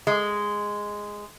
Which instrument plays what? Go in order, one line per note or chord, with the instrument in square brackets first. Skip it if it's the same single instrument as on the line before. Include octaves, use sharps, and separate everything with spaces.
[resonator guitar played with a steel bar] G#3